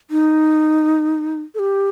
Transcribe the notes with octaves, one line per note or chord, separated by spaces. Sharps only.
D#4
A4
G4